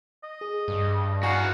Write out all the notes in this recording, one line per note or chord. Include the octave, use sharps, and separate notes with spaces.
D#5
G#4
G2
F#4 F5 G#5 A#5 G6